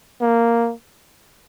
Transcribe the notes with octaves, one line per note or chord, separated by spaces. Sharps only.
A#3